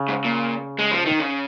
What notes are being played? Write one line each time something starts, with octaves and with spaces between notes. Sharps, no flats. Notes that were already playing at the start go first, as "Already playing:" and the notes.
Already playing: C#3
G#2
A#2
G#3
F3
D#3
C#3